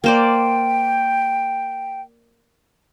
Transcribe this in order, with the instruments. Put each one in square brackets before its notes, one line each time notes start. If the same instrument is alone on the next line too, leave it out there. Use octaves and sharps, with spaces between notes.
[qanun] A#3 C5 D5 [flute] G5